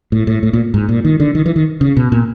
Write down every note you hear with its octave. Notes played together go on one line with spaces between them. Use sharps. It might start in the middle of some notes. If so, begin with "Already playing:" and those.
A2
A2
A2
A#2
G#2
A#2
D#3
D3
D#3
E3
D#3
C#3
B2
A#2